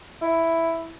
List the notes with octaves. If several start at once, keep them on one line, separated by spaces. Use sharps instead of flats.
E4